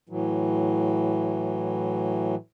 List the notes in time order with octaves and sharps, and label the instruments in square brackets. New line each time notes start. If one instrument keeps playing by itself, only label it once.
[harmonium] A2 E3 F#3